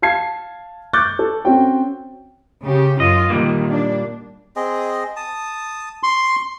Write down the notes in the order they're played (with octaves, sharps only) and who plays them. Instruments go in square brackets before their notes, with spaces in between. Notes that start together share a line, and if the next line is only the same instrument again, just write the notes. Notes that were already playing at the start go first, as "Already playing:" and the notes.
[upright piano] F5 A5 G#6 C7
C#6 D6 F#6 G6 A6
A4
C4 C#4 F#4 G5
[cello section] C#3 G4
[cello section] F#2 F4 [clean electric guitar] D#5
[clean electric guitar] A#2 G3 A#3 [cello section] D#3
[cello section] D4
[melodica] C4 G#4 D#5
A5 D#6
[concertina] C6 [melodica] C#6